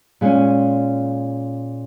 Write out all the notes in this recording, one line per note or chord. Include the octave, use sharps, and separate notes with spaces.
A#2 G#3 C#4